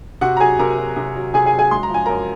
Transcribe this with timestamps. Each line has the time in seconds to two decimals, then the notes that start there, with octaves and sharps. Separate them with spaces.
0.21 C3 F#4 F#5
0.37 A#5
0.40 F#3 G#4 G#5
0.59 C3 A#4 A#5
0.78 F#3
0.96 C3
1.16 F#3
1.34 C3 G#4 G#5
1.46 G#4 G#5
1.53 F#3
1.59 G#4 G#5
1.71 G#3 C6
1.83 A#5
1.90 F3 G#5
2.06 F#2 A#4 A#5